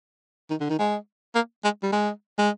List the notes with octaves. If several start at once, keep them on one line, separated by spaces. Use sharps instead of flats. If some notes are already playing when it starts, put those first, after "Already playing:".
D#3
D3
D#3
G#3
A#3
G#3
G3
G#3
G#3